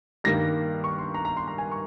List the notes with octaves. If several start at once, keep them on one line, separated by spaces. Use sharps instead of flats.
G2 D#3 G3 A#3 A#6
C#6
C6
A#5
A#5
C6
A#5
G#5
C#6